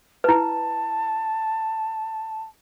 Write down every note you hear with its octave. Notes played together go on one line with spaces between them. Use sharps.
E4 B4 A5